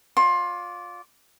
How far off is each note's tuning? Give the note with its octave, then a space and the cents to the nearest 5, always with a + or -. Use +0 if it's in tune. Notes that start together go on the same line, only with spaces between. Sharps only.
F4 +25 D5 -20 C6 +25